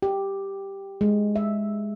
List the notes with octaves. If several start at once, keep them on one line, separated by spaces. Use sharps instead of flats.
G4
G#3
E5